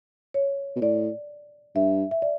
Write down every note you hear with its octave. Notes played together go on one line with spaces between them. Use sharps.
C#5
B2
A2 D5
G2 E5
E5
D5